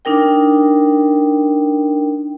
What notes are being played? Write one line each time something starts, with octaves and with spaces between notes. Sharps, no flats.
D4 D#4 A#4 G5